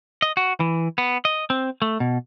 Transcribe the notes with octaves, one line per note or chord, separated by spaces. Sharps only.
D#5
F#4
E3
B3
D#5
C4
A3
B2